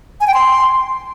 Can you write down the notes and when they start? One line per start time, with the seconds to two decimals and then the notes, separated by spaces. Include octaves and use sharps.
0.21 G#5
0.27 G5
0.34 C6